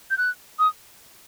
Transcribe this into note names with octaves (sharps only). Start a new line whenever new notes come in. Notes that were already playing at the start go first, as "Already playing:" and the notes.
G6
F#6
D#6